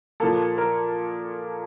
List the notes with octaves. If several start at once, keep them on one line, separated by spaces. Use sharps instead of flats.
A#2 F3 A#3 A4
A#4